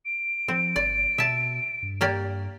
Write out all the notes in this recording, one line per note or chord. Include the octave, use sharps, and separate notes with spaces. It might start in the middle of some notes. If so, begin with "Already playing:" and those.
D7
F3 C4
G1 D5
B2 E5 A5
G2
A#3 G4 D5